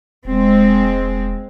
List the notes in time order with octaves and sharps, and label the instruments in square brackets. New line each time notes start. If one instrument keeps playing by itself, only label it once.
[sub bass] E1 [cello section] G#3 C4